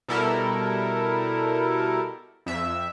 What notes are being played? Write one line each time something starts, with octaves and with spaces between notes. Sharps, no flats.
B2 G3 E4 A4 A#4
F2 E5